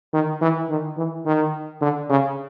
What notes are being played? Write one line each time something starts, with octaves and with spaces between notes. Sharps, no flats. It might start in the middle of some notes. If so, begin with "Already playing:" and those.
D#3
E3
D#3
E3
D#3
D3
C#3